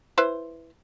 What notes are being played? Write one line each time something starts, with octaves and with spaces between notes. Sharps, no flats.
E4 B4 C5